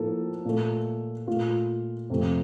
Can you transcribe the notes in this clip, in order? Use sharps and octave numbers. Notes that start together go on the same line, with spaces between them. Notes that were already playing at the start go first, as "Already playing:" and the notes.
Already playing: A2 F3 A#3 A4
A#2 A3
A#2 A3 F4
F2 C3 F3 A3